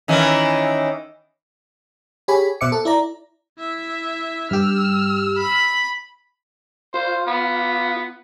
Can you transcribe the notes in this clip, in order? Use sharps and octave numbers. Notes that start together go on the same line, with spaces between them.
D#3 E3 C#4
G4 G#4 C#5 G#5 B5
B2 C5 E5 D6 C#7
A4
E4 D5 A#5
E4 E5
G2 G4 E6 F6
B5
F4 C5
B3